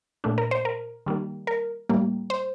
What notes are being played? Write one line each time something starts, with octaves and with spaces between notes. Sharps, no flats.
A#2 A3 D4
A#4
C5
A#4
D#3 G3 A#3
A#4
A2 G3 A#3
C5